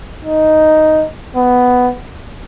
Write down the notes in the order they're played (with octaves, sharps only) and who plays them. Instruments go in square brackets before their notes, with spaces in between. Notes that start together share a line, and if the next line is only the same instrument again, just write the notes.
[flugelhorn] D#4
B3